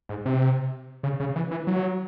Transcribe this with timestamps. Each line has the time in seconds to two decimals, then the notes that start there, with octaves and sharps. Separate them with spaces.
0.09 G#2
0.26 C3
1.03 C#3
1.20 C#3
1.36 E3
1.51 E3
1.67 F#3